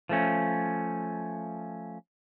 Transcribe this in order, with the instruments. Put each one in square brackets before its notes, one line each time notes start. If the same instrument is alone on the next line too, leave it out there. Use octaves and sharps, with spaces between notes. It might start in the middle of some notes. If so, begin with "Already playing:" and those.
[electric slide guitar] F3 A3 C#4